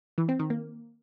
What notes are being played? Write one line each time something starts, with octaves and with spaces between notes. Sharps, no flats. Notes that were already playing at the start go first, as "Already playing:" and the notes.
E3
C4
D#3
A#3